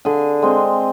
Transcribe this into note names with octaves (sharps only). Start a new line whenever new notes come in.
D3 G#4 G#5
G#3 C4